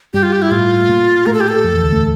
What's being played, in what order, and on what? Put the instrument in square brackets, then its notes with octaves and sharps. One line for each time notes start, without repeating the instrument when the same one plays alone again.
[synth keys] G2 G3 [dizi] G4
[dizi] F4
G4
E4
[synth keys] A2 A3 [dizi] F4
[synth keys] A3
A#2 A#3
[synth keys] A2 A3 [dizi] A#4
[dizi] A4
G4
A4
[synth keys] F2 F3
E2 E3
D2 D3
A2 A3